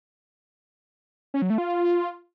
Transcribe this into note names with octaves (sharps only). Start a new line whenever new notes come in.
C#4
F#3
A3
F4